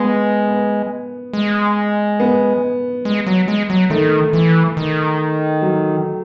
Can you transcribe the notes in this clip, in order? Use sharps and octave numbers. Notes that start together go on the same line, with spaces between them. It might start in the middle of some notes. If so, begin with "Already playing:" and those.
Already playing: G#3 B3
B3
G#3
B3
G#3
F#3
G#3
F#3
D#3 A3
E3
D#3
F#3